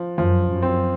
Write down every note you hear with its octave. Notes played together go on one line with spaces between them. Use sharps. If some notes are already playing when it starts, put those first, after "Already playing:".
Already playing: F3
F#2 F3
F#2
C4